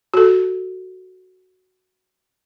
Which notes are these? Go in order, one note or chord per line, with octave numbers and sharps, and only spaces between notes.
F#4 A4